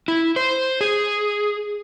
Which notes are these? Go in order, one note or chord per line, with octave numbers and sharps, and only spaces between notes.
E4
C5
G#4